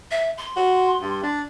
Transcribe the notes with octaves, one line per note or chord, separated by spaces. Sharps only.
E5
C6
F#4
G2
D4